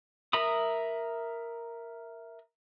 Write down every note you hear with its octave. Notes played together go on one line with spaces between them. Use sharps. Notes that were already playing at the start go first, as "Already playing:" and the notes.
A#4 E5 A#5 B5 D#6